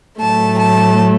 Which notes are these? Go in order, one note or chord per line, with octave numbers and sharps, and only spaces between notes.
A2 F#3 A3 A5
A5